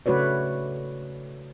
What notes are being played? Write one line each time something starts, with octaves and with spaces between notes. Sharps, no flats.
C#3 A3 F#4 B4 C#5 D5